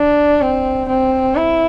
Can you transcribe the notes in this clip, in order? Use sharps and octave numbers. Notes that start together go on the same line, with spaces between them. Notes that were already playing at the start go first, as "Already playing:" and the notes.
Already playing: D4
C4
C4
E4